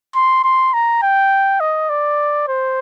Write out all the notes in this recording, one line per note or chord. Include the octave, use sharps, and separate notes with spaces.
C6
C6
A#5
G5
D#5
D5
C5